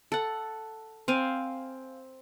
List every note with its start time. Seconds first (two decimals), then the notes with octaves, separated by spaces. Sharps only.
0.12 A4 F#5
1.08 C4 F5 G#5